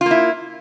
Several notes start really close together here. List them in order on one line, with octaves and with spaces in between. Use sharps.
F4 A#3 E4